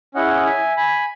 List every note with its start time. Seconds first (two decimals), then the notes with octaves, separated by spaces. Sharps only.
0.15 C#4 E4 G#4 D#5 F#5
0.46 E5 G#5
0.77 G#5 B5